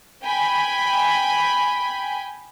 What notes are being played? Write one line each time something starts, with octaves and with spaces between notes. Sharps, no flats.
G5 G#5 B5